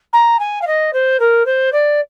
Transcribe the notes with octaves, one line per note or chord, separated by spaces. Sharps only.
A#5
G#5
F5
D#5
C5
A#4
C5
D5